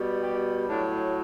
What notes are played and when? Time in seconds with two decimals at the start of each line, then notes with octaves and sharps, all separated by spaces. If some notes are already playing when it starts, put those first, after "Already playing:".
Already playing: B2 G3
0.22 G4
0.68 A2 F#3 D4